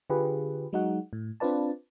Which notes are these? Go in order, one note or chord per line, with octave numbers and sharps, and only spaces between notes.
D3 F4 G4 G#4 B4
F#3 G#3 D#4 F#4 F#5
A2
C4 D4 F4 B4 D5 A5